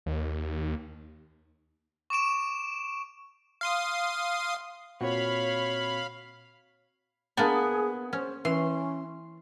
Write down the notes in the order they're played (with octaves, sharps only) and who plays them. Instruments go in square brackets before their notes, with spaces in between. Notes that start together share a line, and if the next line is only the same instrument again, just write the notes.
[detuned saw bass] D#2
[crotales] C#6 D6 D7 E7
[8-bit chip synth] F5 C6 D#6
[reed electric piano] A#2 C4 F#4 [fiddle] C#5 [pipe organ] F5 B5
[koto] A#3 D4 D5 [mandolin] B3 [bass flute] G#4
[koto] C#4 [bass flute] C5
[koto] E3 [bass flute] C#4 [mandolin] C6